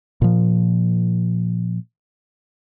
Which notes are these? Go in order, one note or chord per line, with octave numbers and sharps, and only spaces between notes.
A#2 F3